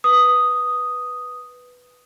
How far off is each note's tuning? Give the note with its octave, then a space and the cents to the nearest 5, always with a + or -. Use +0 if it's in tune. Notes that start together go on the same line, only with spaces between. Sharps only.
B4 +0 D#6 +0